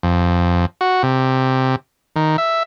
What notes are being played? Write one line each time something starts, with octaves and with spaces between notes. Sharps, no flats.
F2
F#4
C3
D#3
E5